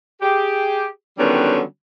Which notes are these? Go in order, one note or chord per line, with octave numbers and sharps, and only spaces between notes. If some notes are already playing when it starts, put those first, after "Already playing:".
G4 G#4
D3 D#3 F#3 G3 B3 C#4